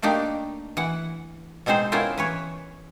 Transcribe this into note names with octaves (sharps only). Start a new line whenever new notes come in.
A3 A#3 D4 D#4 G4
E3 F#5
B2 G#3 C4 D#4 C5
B3 C#4 E4 F4 A#4 C5
E3 B4 C#5